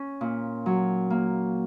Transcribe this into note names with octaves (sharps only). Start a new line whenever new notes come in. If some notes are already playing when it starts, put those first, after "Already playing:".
Already playing: C#4
A#2
F#3
A#3